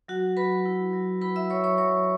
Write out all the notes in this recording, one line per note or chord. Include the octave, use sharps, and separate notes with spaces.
F#3 F#4 F#5
F#3 B4 B5
E4
F#3
E4 B4 B5
E5 E6
F#3 C#5 C#6
C#5 C#6
F#3 C#5 C#6